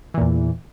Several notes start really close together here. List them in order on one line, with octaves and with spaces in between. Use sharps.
E3 A#2 E2